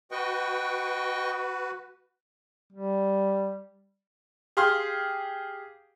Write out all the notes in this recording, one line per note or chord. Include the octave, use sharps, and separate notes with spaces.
F#4 B4 D#5 G5 C#6
G3
G4 G#4 F5 C6 F6